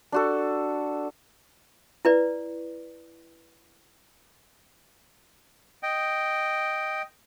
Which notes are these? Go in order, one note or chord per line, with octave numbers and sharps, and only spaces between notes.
D4 F#4 A4
E4 B4 D5
D#5 G5